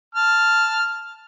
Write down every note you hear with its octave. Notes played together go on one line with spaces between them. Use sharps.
A5 F6